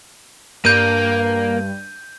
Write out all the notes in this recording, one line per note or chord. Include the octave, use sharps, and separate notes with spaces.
G2 A#3 G6 D#7